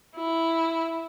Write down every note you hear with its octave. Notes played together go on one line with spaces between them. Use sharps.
E4